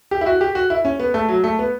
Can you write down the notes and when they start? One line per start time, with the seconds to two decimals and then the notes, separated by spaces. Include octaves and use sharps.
0.11 G4
0.21 E4
0.26 F#4
0.41 G4
0.55 F#4
0.70 E4
0.85 C#4
1.00 B3
1.14 A3
1.29 F#3
1.44 A3
1.59 B3